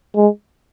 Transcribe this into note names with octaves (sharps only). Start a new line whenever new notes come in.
G#3